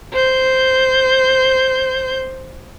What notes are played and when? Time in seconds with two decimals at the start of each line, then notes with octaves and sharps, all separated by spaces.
0.13 C5 G6